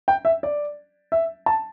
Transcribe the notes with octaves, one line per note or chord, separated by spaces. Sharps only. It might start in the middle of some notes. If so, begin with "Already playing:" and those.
G5
E5
D5
E5
A5